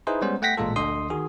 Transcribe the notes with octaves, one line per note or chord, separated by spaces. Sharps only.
D#4 E4 G#4 B4 C5
G3 G#3 B3 C#4 C5
A3 F#5 G5 A#6 B6
A1 A#2 G#3 F4 A4
D2 D3 D#5 C6 D#6
D#3 F#4 G#4